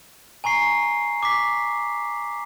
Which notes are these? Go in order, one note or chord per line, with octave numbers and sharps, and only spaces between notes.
G#5 A#5 C#6 C7
D6 B6